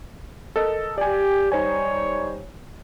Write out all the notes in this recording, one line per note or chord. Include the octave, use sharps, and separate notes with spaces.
A4 A#4 D#5
G4 D5 G#5
G3 D#4 C5 C#5 G#5